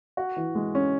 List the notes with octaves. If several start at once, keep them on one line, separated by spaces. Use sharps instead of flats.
F#4
E3
G#3
C#4